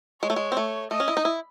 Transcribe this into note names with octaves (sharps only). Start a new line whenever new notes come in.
G#3 C#5
A3
G#3
C4
A3
A3 D#5
C#4
E4
D#4
E4